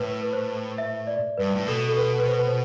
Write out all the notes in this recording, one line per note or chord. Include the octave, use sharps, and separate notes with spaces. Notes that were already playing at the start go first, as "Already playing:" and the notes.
Already playing: A2 B4
B4
C5
E5
D5
G2 B4
A2
B2 A4
A4
B4
B4
C5
B4
C5